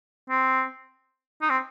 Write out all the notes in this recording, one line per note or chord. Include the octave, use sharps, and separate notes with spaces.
C4
D#4
C4